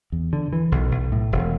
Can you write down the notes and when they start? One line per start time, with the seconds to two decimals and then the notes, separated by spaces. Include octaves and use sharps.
0.12 E2
0.33 D3
0.53 E3
0.72 B1
0.92 B1
1.12 A2
1.32 E1